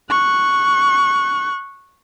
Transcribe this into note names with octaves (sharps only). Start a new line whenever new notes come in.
C#6 F#6